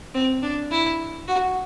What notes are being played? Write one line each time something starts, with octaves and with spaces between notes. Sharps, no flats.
C4
D4
E4
F#4